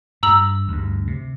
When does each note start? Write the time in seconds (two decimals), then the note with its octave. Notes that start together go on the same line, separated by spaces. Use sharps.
0.23 G2 A#5 E6 F#7
0.68 D2 G2
1.07 C3